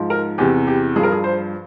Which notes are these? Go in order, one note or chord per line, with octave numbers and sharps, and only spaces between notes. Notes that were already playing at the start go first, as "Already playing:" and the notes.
Already playing: G#2 F3
A#4
E2 C3 E3 G4
G4
G2 F3 G#4
A#4
G#4
C5